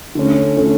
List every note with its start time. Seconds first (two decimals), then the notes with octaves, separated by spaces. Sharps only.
0.15 D3 A3 C#4
0.56 D3 A3 C#4